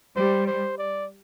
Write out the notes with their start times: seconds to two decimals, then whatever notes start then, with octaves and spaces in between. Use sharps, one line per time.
0.16 G3 C5
0.47 C5
0.78 D5